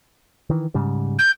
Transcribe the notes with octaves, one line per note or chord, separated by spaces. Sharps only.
D#3 E3
G#2 C#3 G3
G6